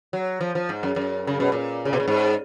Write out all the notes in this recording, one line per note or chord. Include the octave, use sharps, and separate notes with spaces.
F#3
F3
F3
G#2
F#2
F#2
C#3
B2
A#2
C#3
B2
A#2
G#2